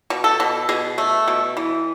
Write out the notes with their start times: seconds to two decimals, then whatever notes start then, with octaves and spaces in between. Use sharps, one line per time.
0.10 B2
0.24 A4
0.40 B2
0.69 B2 G#4
0.98 A3
1.27 B2
1.57 E3